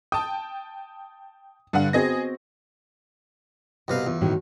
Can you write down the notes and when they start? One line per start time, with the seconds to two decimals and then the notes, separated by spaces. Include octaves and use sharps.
0.12 G5 A5 D#6
1.73 G2 D3 F5 F#5
1.93 B3 C4 F#4 G#4 D#5 A#6
3.88 C2 B2 B4 F5 F#5
4.07 E2 F4
4.21 A2 D#3 F#4